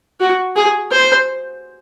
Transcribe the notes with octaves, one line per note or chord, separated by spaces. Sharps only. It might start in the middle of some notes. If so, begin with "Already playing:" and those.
F#4
G#4
C5